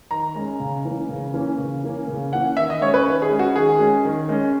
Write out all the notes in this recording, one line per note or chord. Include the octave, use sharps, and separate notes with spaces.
D#3 A#5
G#3 C#4
C#3
E3 A#3 C#4
C#3
E3 A#3 C#4
C#3
E3 A#3 C#4
C#3
E3 A#3 C#4 F#5
D#3 E5
D#5
G#3 C#4 C#5
B4
D#3
G#4
G#3 C#4
F#4
D#3 G#4
G#3 C#4
D#3
G#3 C#4